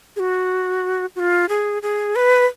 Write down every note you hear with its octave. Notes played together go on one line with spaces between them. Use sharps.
G#4
F#4
F#4
F4
G#4
G#4
B4